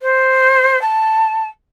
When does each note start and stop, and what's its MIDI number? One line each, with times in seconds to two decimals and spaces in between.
0.02 0.81 72
0.81 1.47 81